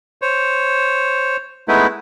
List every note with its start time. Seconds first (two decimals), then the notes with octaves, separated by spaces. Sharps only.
0.22 C5 C#5
1.68 G#3 A3 B3 D#4 E4 B4